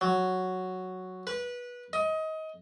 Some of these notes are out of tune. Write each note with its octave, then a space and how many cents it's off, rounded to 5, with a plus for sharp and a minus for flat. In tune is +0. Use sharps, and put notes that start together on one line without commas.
F#3 +0
B4 -20
D#5 +25